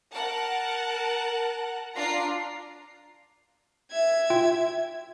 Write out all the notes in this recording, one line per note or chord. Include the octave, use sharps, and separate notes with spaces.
A#4 F#5 A5
D4 F4 A#5 C7
E5 G#6
F4 G5